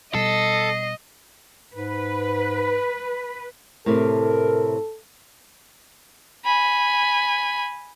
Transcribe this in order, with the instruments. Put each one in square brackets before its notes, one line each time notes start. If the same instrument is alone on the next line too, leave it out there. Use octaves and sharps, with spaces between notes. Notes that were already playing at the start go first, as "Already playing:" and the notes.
[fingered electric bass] B2 G3 [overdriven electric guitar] A4 [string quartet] D#5 [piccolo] C7
[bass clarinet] G#2 [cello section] B4
[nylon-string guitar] A2 C3 [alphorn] A4 [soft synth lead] A#4
[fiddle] G#5 B5